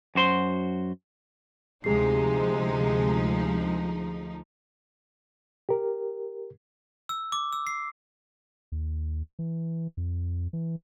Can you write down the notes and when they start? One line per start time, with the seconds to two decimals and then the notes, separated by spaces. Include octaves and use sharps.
0.15 F#2 F#4 C5 B5 C6
1.84 D2 C3 F3 G#3 D#4 G#4 C7
5.69 G4 A#4
7.09 E6
7.32 D6
7.53 E6
7.67 C7
8.72 D#2
9.39 E3
9.97 F2
10.53 E3